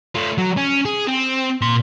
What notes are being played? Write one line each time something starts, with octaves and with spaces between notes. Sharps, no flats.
A3 F4
F#3
C#4
G#4
C4
A#2 C6